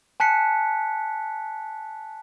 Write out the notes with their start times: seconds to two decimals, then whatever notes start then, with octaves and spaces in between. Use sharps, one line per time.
0.20 G#5 A5 F#6 B6 C#7